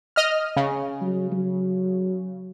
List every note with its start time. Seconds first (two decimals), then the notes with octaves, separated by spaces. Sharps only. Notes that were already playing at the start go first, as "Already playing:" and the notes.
0.16 D#5 F6
0.56 C#3
1.01 F#3
1.32 F#3